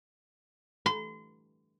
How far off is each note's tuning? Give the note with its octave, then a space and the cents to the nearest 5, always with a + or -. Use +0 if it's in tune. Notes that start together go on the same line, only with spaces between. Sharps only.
C6 -35